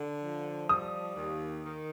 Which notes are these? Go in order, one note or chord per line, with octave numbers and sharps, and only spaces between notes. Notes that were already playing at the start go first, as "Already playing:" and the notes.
Already playing: D3
F3
G3 D#6
D#2
D#3